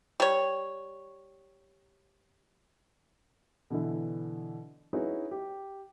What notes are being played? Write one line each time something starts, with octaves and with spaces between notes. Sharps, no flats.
G3 C#5
B2 D3 E3 E4
C#4 D#4 E4 F#4 G#4 B4
G4